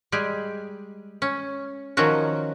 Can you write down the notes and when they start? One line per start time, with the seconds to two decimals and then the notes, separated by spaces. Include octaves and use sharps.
0.12 G3 G#3 G4 G#4
1.22 C#4
1.97 D#3 F3 F#3 C#4 F#4